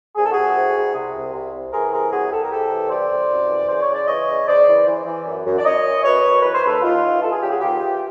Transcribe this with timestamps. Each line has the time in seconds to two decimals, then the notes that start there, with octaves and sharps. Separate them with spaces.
0.16 C2 G#4
0.24 A4
0.31 C2 F#4 G#4
0.55 C3
0.75 C2
0.95 C3
1.15 C2
1.33 C3
1.54 C3
1.72 E3 G#4 A#4
1.92 C3 G#4 A#4
2.12 C2 F#4 G#4
2.32 C2 G4 A4
2.43 A#4
2.52 C3 G4 A4
2.71 E3
2.86 C#5
2.90 C2 C5 D5
3.10 C2
3.30 F#2
3.49 E3
3.68 C#3 C5
3.82 C#5
3.89 C#3
3.95 D5
4.07 E3 C#5 D#5
4.28 C#3
4.47 C#3 C5 D5
4.67 E3
4.86 E3
5.06 E3
5.25 F#2
5.45 F#2
5.58 D5
5.65 F#2 C#5 D#5
5.85 E3
6.03 F#2 B4 C#5
6.24 F#2
6.42 E3 B4
6.54 C5
6.62 D#2 A4 B4
6.82 D#2 D#4 F4
7.01 E3
7.21 E3 A4
7.32 G#4
7.41 C#3 G4
7.50 F#4 G#4
7.60 D#2 F4 G4
7.80 E3